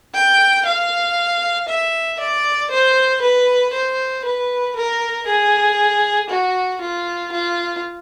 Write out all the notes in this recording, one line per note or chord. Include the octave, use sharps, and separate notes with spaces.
G5
F5
E5
D5
C5
B4
C5
B4
A#4
G#4
F#4
F4
F4